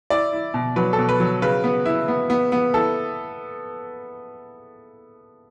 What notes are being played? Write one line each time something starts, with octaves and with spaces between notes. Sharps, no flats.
E4 D5
E4
B2
F#3 B4
A4
B2
B4
F#3
C#3 B4
B3
E4
B3
B3
B3
E4 A4